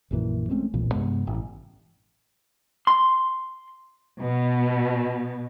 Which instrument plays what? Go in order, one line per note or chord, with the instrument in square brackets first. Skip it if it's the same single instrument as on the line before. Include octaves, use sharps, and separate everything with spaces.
[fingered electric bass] A#1 F#2 A#2 E3
G#3 A3 C4 C#4
D1 B1 A#2 E3
G2 C3 G#3 B3
A1
[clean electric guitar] C6
[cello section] B2